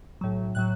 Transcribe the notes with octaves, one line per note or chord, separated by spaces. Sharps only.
B1 A2 F#3
A2 F#3 F#6